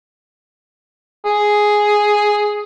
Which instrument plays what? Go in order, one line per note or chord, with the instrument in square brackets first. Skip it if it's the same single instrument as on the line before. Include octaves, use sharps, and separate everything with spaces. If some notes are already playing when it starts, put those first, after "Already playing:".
[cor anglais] G#4